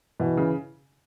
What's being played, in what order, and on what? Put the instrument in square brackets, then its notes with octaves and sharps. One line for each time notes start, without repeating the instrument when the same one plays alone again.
[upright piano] B2 [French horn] E3
[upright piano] C#3